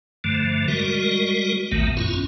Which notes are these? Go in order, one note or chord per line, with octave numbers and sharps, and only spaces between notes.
G2 D3 F3 A3
G3 G#3 F#4 A#4
A1 D#2 A#2 D#3 A3 B3
F#2 C#4 E4 F4